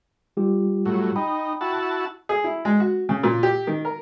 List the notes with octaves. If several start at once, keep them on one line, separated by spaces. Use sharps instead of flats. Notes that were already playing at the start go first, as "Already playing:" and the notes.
G3 F4 G4
A2 F#3
D#4 G5 B5
E4 F#4 A5
G#4
E4
G#3
F#4
C#3
A#2
G4
D#3
A#4